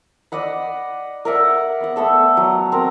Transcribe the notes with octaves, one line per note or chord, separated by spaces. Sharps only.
D5 D#5 F#5 B5
A#4 D5 E5 F#5
B3 F#5
A3 B3 A4 E6
F#3
C4 A#4